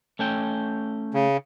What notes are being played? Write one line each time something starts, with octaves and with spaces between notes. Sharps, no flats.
A3 C#4 G5
C#3